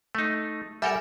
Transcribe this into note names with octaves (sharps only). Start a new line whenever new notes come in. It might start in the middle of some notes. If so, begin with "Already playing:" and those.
A3 D#4
G3 A4 A#4 E5 F#5 G#5